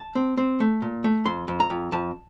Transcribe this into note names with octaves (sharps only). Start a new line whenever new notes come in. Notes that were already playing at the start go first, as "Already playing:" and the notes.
Already playing: A5
C4
C4
A3
A#2
A3
F2 C6
F2
A#5
F2
F2 A5